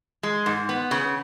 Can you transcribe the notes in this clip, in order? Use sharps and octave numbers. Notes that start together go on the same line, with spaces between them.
G#3
G#2
B3
C#3